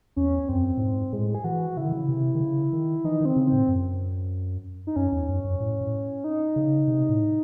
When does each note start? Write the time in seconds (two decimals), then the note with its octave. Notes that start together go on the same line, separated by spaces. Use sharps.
0.16 E2 C#4
0.49 F#2 C4
0.77 A2
0.81 G#2
1.13 A2 G#3
1.35 G#4
1.44 E3 F#4
1.77 C#3 E4
1.85 D#3
1.92 C#3
2.09 C3
2.35 D#3
2.41 C#3
2.73 D#3
3.04 E3 D#4
3.21 D#3 C4
3.36 C#3
3.46 C4
3.52 A2
3.68 F#2
4.87 D#4
4.96 F#2 C#4
5.12 E2
5.28 F#2
5.44 F#2
5.60 A2
5.81 A2
6.24 D#4
6.56 C#3
6.88 C3
7.09 A2